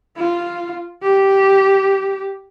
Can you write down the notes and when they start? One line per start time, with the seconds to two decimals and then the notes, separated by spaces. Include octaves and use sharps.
0.17 F4
1.02 G4